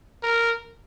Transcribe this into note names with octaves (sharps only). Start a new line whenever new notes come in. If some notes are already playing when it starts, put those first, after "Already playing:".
A#4